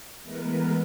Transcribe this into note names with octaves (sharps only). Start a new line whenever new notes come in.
E3 G#3 A3 B3 A#4 B4